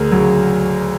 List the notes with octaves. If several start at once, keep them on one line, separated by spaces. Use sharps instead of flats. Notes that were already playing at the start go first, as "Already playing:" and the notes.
Already playing: D2 G#4 A#4
C#3 F#3